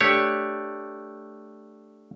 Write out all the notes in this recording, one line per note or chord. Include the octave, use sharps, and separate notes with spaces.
A3 D4 G4 C#5